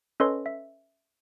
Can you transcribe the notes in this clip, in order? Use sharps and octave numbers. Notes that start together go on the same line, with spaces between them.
C#4 A4 B4 C#5 D#5 C6
E5